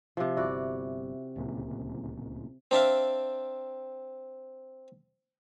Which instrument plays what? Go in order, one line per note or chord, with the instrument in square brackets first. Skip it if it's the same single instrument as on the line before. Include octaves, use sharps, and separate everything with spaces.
[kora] C3 F3
[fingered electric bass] G1 [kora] E4 F#4 D5
[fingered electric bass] D1 C#2 A#2
[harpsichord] C4 D4 E5 F5